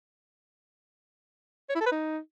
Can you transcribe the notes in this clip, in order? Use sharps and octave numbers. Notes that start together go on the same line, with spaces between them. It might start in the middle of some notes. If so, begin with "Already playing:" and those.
C#5
E4
A4
B4
D#4